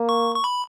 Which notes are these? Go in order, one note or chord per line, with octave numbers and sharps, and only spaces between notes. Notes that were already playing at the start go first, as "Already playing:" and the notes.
Already playing: A#3
C#6
C#6
B5